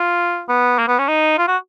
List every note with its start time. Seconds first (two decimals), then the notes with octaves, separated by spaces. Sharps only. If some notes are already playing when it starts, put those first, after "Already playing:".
Already playing: F4
0.49 B3
0.79 A#3
0.88 B3
0.99 C#4
1.08 D#4
1.38 F4
1.48 F#4